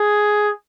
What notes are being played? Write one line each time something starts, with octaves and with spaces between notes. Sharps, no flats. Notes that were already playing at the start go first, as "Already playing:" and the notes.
Already playing: G#4